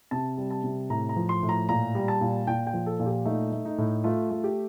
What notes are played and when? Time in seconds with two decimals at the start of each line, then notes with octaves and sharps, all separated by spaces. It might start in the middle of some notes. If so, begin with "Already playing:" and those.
0.11 C3 A5
0.38 G3
0.51 A5
0.64 C3
0.90 A2 A#5
1.09 A#5
1.16 F3
1.29 C6
1.43 A2
1.49 A#5
1.69 A#2 A#5
1.95 G3
2.08 A5
2.21 A#2
2.47 A#2 G5
2.67 G5
2.74 F3
2.86 A4
3.00 A#2
3.06 G4
3.25 A3 D#4
3.52 A3
3.65 D#4
3.78 A2
4.04 A3 F4
4.31 A3
4.44 G4